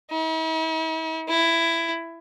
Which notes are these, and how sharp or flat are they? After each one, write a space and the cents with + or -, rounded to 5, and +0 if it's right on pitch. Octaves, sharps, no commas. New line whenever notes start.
E4 -45
E4 +10